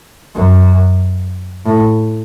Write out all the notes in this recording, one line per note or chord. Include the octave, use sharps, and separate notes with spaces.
F#2
A2